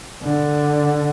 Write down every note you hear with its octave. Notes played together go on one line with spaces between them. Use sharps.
D3